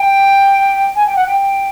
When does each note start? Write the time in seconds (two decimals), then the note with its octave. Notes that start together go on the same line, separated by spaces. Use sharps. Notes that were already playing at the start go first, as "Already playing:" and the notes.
Already playing: G5
0.96 G#5
1.07 G5
1.16 F#5
1.26 G5